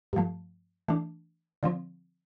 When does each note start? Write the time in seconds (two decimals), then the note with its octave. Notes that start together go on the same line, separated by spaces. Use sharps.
0.13 G2 F3 A3
0.88 E3 A3 D4
1.63 D3 F3 C4